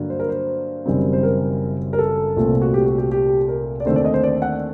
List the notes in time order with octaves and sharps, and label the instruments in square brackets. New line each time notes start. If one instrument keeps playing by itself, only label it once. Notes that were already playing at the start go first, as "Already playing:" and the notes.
Already playing: [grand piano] G2 D3 F#3 A#3
C5
A#4
C5
F#1 F#2 D#3 G3 C4
C5
A#4
A#4
A4
C2 A#2 A3 C4
F#4
G4
F#4
G4
G4
A#4
D5
D#2 D3 A3 C4 C5
D5
D#5
C5
D5
F#5